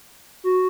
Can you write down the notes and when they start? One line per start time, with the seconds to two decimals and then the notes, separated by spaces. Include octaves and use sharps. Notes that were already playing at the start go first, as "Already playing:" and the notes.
0.44 F#4